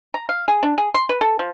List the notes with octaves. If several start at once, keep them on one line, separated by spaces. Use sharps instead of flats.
A#5
F5
G#4
D4
G#4
C6
B4
A4
F3